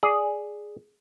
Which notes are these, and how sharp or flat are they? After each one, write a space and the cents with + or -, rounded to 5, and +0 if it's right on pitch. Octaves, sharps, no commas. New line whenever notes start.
G#4 +0 D5 +0